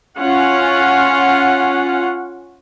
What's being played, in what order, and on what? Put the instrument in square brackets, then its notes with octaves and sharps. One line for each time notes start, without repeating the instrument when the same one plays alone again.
[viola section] C#4 F4 F#5